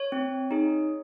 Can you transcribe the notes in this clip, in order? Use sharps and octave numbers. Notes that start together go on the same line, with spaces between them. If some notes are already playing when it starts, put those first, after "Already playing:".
Already playing: C#5
C4
D#4 G#4